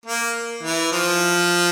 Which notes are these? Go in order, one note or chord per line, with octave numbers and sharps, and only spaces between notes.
A#3
E3
F3